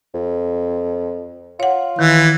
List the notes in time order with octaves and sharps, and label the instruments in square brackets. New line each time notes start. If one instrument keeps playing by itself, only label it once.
[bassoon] F2
[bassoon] F4 [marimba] C#5 F#5
[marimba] D#3 [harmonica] E3